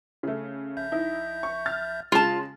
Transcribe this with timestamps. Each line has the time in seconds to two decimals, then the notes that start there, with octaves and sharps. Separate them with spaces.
0.23 C#3 A3
0.77 A#1 E5 G6
0.92 D#4 E4
1.43 C#6
1.66 F6 A6
2.12 C#3 G#3 F4 A5